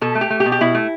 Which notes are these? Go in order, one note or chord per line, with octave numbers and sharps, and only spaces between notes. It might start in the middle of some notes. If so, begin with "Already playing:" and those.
B2 A4
A3
G4
A3
G4
B2
G4
B2 E4
A3